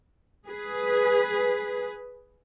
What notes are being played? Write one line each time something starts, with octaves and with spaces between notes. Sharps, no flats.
G#4 B4